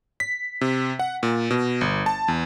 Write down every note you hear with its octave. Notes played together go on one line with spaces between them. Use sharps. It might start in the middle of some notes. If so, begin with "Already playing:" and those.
B6
C3
F#5
A#2
B2
G1
A5
E2